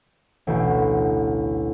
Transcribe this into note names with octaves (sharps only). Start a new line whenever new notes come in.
A1 D2 B2 G6